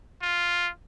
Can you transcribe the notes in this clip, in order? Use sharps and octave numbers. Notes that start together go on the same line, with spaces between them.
F4